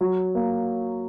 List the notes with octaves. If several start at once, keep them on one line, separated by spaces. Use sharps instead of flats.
F#3
A#3